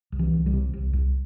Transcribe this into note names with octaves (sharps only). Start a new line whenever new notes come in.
C2
E3
C2
G3
C3
C2
C2